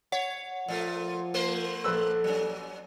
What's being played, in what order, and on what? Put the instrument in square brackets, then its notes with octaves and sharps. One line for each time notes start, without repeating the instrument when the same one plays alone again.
[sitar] C#5 [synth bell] F#5
[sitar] A#2 A3 [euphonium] F3
[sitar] A3 A#3 C5
[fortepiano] A#1 B4 E6 [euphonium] A4
[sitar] F#3 C#4